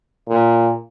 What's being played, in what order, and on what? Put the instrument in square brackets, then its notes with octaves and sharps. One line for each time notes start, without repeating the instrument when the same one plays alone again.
[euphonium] A#2